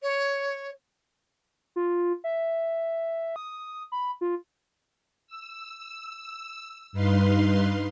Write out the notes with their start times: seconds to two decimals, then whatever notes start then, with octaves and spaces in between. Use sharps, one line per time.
0.02 C#5
1.76 F4
2.24 E5
3.36 D#6
3.92 B5
4.21 F4
5.27 E6
6.92 G2 D#4 B4 F5 C6